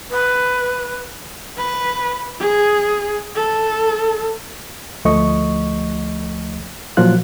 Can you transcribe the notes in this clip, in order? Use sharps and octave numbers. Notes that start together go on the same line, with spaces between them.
B4
B4
G#4
A4
D2 F3 A3 D#5 C#6
A#2 F3 F#3 F4 F#6